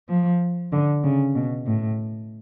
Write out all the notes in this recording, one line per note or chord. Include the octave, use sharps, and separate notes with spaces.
F3
D3
C#3
B2
A2